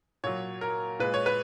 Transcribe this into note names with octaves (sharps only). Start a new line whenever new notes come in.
A#2 F#3 C#5
A#4
A#2 G#3 B4
C#5
B4